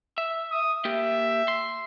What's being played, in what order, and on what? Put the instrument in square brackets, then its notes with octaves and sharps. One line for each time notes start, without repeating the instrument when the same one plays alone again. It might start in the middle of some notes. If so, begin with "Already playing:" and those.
[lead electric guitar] E5
[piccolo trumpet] D#6
[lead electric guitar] A#3 G4 [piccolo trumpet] E5
[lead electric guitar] C6